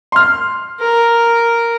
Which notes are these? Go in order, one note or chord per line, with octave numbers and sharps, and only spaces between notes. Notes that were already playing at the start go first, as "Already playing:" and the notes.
C6 F6
A#4